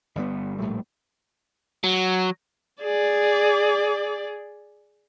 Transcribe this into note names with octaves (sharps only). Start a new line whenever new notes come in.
G1 G3 B3
A#1 A2 G3 A3
F#3
G#4 D5